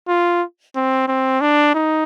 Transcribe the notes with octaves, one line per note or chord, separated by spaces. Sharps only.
F4
C4
C4
D4
D#4